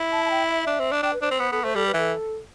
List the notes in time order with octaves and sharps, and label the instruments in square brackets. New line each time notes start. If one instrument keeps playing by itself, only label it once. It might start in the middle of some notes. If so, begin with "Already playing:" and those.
Already playing: [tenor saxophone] E4
[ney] A5
A5
G5
E5
[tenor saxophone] D4
C4
D4
[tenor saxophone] D4 [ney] G5
[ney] B4
[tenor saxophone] D4 [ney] C5
[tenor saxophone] C4
[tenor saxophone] B3 [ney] C5
[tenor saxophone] B3 [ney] A4
[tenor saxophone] A3 [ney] C5
[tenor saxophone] G3 [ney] A4
[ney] B4
[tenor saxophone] E3 [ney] A4